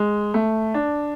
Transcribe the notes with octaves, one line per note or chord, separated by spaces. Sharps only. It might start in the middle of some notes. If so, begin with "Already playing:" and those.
Already playing: G#3
A3
D4